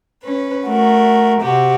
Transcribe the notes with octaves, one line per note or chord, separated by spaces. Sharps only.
C#4 B4
A3 F#4 A#4
C3 F#4 G4